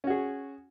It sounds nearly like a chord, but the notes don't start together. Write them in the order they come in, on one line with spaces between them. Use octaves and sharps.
C#4 F#4 G#4